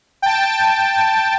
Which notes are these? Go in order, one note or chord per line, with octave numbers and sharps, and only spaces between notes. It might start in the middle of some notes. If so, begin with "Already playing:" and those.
G5 A5